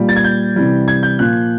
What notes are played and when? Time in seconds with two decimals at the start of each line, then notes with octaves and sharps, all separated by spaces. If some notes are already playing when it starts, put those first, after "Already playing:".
Already playing: A#2 G3
0.09 A6
0.16 G#6
0.24 G6
0.56 C3 E3 G3
0.88 G#6
1.03 G6
1.19 A#2 F3 F#6